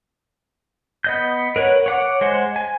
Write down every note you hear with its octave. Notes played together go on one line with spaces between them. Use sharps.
B3 D#5 G6
A#4 B4 C#5 F#5
C#5 F#5 D6
G#3 C5 F#5
G#5